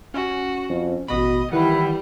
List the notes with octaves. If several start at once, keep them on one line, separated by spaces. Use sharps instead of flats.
C#4 F#4
F2
A1 B2 F#4 D#5 B5
D#3 E3 G3 E4 B4 F#5